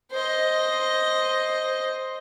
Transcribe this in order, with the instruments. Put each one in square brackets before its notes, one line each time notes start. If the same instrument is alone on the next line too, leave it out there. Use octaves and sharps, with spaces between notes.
[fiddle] C5 D#5